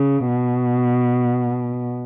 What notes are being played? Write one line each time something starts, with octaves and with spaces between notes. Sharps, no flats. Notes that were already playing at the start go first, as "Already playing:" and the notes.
Already playing: C#3
B2